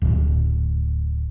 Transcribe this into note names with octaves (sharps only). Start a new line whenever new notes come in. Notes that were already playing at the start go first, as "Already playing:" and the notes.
D1